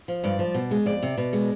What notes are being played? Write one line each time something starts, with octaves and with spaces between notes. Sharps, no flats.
F3
G2 D5
F3
B2
G#3
F2 D5
C3
B2
G#3